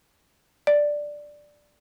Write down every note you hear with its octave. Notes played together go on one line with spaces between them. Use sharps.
D5